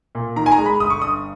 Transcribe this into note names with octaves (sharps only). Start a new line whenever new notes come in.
A#2
D#3 A#5
G#5
A#5
G#3
B5
G1 D#6
C#6
G2 D#6